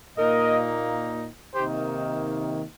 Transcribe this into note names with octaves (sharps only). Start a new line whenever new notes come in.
A#2 A#3 D#4 A#4 D#5
C3 D#3 A#3 D#4 G4 C5